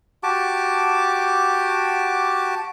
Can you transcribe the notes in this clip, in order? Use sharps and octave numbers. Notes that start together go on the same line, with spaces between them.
F#4 G4 A5 D6